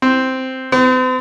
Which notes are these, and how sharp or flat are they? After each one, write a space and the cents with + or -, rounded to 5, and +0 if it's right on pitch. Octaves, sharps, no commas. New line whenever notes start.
C4 -5
C4 -45